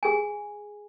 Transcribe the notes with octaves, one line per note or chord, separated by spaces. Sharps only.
G#4 G#5